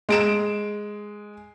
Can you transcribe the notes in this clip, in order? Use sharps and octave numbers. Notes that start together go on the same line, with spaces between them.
G#3 D7 E7